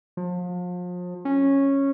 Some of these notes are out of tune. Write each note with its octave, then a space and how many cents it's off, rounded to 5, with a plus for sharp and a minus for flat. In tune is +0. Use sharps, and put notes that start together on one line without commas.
F3 +35
C#4 -10